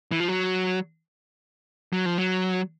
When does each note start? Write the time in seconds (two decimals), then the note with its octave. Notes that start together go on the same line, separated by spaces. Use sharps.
0.12 E3
0.20 F3
0.28 F#3
1.93 F#3
2.06 F3
2.18 F#3